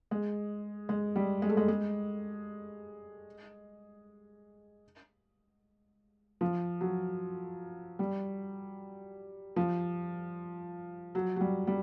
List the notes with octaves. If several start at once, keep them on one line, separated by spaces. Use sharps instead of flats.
G#3
G#3
G3
G#3
A3
G#3
G#3
F3
F#3
G3
F3
F#3
F#3
G3
G3